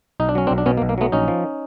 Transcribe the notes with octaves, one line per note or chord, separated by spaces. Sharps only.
B1 D#4
D4
F#3 C#4
C4 D4
B1
D4
B2 B3 C#4
A#3
B1
A#3
F#3 A3 B3
A#1 C#4 D#4
F3